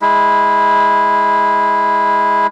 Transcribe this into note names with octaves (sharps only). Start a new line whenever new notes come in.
G#3 E4